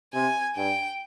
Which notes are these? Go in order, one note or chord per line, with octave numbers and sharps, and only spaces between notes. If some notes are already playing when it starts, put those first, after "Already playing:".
C3 G#5
G2 G5